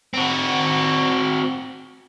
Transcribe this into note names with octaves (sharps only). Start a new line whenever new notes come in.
C4 F#4